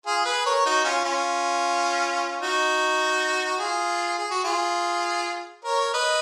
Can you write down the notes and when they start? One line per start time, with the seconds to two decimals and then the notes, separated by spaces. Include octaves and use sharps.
0.06 F4 G#4
0.25 G#4 B4
0.46 A#4 C#5
0.66 D#4 F#4
0.85 C#4 F4
1.04 C#4 F4
2.42 D#4 F#4
3.59 F4 G#4
4.18 G#4
4.31 F#4
4.44 F4 G#4
5.64 A#4 C#5
5.94 B4 D#5